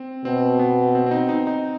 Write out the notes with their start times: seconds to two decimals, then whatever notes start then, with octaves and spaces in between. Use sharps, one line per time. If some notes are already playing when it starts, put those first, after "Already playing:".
Already playing: C4
0.25 B2 C4
0.59 B3
0.95 C4
1.06 C4
1.11 D#4
1.29 D#4
1.47 D#4